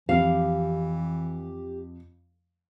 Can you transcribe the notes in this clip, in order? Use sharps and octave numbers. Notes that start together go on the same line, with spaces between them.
F2 E3 G4 F5